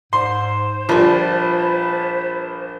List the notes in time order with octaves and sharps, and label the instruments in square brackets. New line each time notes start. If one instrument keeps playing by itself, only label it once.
[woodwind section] G#2 [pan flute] C5 [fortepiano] C6
[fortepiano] A#1 [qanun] F3 G3 [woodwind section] B4 A5 B5